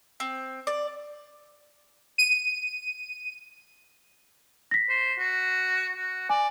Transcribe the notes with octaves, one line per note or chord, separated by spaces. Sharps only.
C4
D5
D#7
A#6 B6
C5
F#4
F#4
D5 G#5